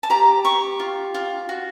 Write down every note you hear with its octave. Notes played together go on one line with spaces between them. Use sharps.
A5
G4 A#5
G4 C#6
F4
F4
F#4